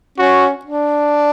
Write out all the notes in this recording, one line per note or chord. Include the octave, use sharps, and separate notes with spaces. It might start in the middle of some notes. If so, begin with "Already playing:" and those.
C#4 F#4
D4